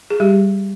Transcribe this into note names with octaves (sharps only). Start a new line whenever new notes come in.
G#4
G3 G4